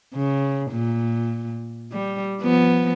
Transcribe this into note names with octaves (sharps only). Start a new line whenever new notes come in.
C#3
A#2
G3
F3 B3